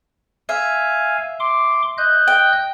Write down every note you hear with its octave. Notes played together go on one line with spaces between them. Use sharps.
E5 F5 G#5
C6 D6
D#5 F#6 G6
G5